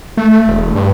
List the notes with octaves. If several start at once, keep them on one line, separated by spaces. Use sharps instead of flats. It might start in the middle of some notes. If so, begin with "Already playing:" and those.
A3
E1
G2